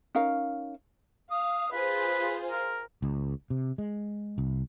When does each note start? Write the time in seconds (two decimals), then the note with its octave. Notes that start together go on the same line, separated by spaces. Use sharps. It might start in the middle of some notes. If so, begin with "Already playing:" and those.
0.15 C#4 D#4 A#4 F5
1.31 F5 D#6
1.72 F4 G#4 B4 C5
2.51 A#4
3.02 C#2
3.50 C3
3.78 G#3
4.38 C2